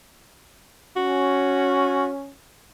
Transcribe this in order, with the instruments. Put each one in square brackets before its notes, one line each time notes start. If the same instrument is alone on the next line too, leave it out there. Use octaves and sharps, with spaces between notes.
[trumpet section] C#4 [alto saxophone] F#4